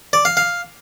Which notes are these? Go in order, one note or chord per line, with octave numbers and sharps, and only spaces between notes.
D5
F5
F5